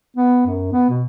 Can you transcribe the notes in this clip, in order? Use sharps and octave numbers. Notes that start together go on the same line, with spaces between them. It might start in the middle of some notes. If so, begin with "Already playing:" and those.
B3
F#2
B3
B2